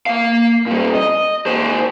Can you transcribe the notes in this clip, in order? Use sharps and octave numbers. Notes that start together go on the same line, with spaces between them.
A#3 F5
A#2 G3
D#5
D#2 C5